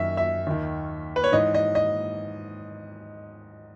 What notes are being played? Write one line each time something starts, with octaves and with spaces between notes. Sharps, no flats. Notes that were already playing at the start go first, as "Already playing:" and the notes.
Already playing: F#2 D#3 E5
E5
D#2 D#3
B4
C#5
G#2 E3 D#5
D#5
D#5